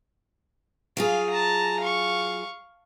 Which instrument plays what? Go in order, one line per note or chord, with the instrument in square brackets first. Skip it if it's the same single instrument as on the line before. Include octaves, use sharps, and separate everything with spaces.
[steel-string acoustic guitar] F#3 F4 G#4 [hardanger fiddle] F5
[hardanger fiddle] A5 A#5
F5 C#6